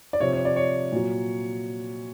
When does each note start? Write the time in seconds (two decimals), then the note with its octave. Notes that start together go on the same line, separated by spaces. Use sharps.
0.13 D5
0.20 C3 F3 C#5
0.33 C#5
0.45 D5
0.56 C#5
0.92 A#2 F#3